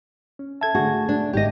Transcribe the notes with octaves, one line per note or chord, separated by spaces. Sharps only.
C#4
A4 E5 A5 G#6
D3 A3 F#4 G#4
D4
G#1 G#2 G4 D#5 A#6